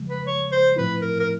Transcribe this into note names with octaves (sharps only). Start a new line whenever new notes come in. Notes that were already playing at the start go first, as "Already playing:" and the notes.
Already playing: C#3 F3 G#3
B4
C#5
C5
A2 F3 A3 C4 E4 B4
A#4
A#4